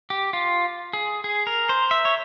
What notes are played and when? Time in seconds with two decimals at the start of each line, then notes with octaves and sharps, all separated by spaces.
0.10 G4
0.33 F4
0.93 G#4
1.24 G#4
1.47 A#4
1.69 C5
1.91 E5
2.05 C#5